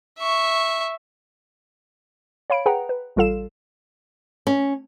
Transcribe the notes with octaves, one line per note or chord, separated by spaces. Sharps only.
E5 C#6
C#5 F5 B5 D7
G#4 B4 F#5 G5 A#5
B4
A1 G3 F4 A4 F5 E7
C#4